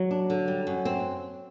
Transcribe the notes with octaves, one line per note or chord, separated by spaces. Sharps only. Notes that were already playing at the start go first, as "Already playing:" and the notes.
Already playing: F#3
D4
D3
G3
F#2
C4